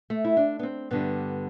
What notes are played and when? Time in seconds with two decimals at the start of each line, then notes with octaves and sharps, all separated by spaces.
0.10 A3
0.25 E4
0.37 D4
0.59 B3
0.63 C4
0.91 G2 D3 G3 B3